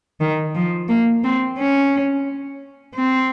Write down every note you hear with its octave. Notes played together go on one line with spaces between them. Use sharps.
D#3
F3
A#3
C4
C#4
C4